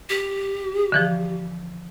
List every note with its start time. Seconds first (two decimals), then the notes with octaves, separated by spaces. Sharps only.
0.10 G4
0.92 D3 E3 F3